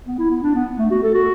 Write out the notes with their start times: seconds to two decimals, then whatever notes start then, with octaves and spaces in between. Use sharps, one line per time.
0.07 B3
0.19 E4
0.30 B3
0.43 D4
0.55 B3
0.78 A3
0.91 F#4
1.03 A4
1.14 F#4